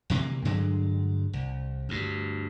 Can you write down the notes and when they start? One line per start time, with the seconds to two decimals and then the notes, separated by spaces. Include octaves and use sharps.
0.10 D2 C3 E3 A#3
0.45 G2 D3 F#3 G#3
1.33 C2
1.89 D2 G2